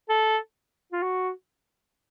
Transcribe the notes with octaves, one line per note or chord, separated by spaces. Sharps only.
A4
F4
F#4